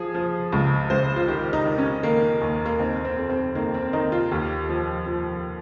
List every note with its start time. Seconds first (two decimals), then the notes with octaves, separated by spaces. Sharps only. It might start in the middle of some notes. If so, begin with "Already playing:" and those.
Already playing: F3 G#4
0.14 F3
0.52 C#2
0.90 C#2 C5
1.16 F4
1.28 D#3 G4
1.53 D#4
1.65 D#3
1.78 C#4
2.03 D#3 A#3
2.41 D#2
2.66 A#3
2.80 D#3 C4
3.05 C4
3.17 F2
3.30 C4
3.55 D#3 A#3
3.74 C4
3.93 D#3 D#4
4.12 F4
4.31 D#2 G4
4.69 F3
5.06 F3